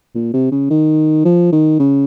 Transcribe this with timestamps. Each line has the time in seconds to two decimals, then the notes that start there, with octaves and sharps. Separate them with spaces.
0.15 A#2
0.34 C3
0.51 C#3
0.70 D#3
1.25 F3
1.52 D#3
1.79 C#3